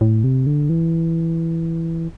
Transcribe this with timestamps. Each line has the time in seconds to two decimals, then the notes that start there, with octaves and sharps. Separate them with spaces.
0.01 A2
0.24 C3
0.47 D3
0.69 E3